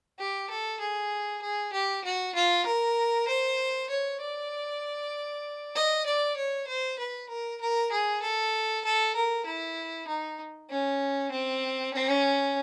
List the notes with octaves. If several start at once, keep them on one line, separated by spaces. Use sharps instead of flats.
G4
A4
G#4
G#4
G4
F#4
F4
A#4
C5
C#5
D5
D#5
D5
C#5
C5
B4
A#4
A#4
G#4
A4
A4
A#4
E4
D#4
C#4
C4
C#4